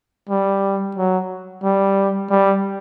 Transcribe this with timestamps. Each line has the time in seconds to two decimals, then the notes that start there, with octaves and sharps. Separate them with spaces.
0.30 G3
0.97 F#3
1.64 G3
2.31 G3